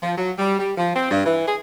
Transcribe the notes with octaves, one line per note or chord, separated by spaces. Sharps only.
F3
F#3
G3
G3
F3
C4
G2
E3
G#4